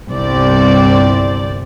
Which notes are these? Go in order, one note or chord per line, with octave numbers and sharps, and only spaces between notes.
G1 C2 C4 D5